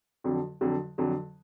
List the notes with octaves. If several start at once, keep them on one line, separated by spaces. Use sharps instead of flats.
F2 D3 F#3
F2 D3 F#3
F2 D3 F#3